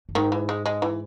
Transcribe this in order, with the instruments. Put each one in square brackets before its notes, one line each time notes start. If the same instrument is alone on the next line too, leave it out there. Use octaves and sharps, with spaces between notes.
[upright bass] F#2
[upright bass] G#2 [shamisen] D#3
[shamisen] E3
G#3
G#3
E3